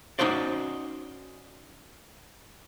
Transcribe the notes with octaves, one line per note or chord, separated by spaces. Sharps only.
C#4 D#4 F#4 C5 D5